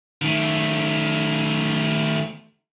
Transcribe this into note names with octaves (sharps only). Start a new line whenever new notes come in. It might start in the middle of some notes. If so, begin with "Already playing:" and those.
D#3 A3